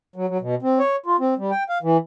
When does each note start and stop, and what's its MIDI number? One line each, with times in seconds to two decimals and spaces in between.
0.16 0.26 54
0.29 0.38 54
0.41 0.55 47
0.62 0.79 60
0.79 0.96 73
1.06 1.17 65
1.20 1.34 60
1.38 1.51 55
1.51 1.63 79
1.69 1.78 77
1.83 1.97 52